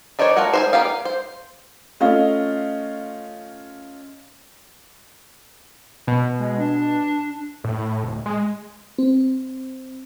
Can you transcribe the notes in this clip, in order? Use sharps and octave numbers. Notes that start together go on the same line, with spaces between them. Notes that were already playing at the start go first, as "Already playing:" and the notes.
D#3 D4 D#4 C5 C#5
A3 F4 F#4 A#4 F#5
G#4 A#4 C5
A#3 B3 F4 G4 F5
F5
C5
A3 C#4 F4 D#5 F5
B2
G#3
D4
A2
D1
G#3
C4